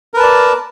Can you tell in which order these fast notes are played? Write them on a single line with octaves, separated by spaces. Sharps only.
A#4 B4 A5 D5